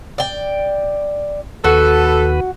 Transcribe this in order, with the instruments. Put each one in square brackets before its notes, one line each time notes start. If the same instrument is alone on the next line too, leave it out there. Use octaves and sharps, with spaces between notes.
[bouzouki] D5 G5
[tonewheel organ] D#2 B4 [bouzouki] F#4 [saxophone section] A4